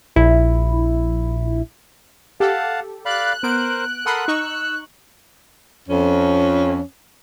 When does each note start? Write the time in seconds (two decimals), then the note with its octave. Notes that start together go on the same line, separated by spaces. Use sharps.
0.16 A#1 E4
2.40 G4 A4 F5 F#5 A5
3.06 D5 F5 B5 F#6
3.43 B3 A#4 C5 D7
4.06 A4 A#4 F#5 B5 C6 D#6
4.28 D#4 C#6 E6
5.89 F2 C#4